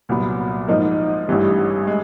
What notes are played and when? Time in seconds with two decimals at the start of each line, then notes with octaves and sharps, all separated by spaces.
0.09 C2 A#2 F#3 B3
0.68 G#2 F3 A#3 D#4
1.28 A1 G2 E3 G3
1.87 G#3